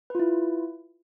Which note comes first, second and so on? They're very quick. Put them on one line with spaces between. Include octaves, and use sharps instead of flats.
B4 F4 E4